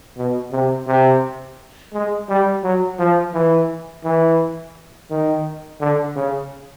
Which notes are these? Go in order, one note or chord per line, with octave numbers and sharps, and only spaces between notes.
B2
C3
C3
G#3
G3
F#3
F3
E3
E3
D#3
D3
C#3